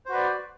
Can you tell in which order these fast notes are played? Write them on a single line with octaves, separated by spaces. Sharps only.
C5 F#4 B4 D5